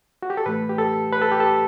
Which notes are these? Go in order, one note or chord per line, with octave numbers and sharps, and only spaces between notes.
F#4
G4
A4
A2 E3 A3 B4
G4
A4
B4
A4
G4
A4